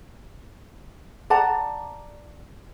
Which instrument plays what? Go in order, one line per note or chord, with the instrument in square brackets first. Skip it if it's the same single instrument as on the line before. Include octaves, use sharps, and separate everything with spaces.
[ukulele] D5 F#5 A5 A#5